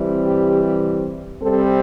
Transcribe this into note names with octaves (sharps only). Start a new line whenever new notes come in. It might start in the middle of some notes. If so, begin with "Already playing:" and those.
Already playing: C3 E3 G3 C4
G4
C3 G3 C4 A4